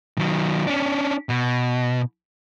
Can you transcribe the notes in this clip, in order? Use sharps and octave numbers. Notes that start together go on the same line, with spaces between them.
D#3 F#3
C#4 D4
B2